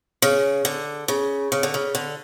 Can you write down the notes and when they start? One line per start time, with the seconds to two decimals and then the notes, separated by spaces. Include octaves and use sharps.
0.22 C#3
0.65 D3
1.08 C#3
1.52 C#3
1.63 D3
1.74 C#3
1.95 D3